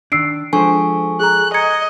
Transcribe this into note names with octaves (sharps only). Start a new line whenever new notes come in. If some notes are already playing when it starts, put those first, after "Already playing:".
D#3 D4 E6 C7 D7
F3 G#3 D4 A4 C5 G#5 C#6
G#4 A#5 F#6
D#5 A#5 G#6 C#7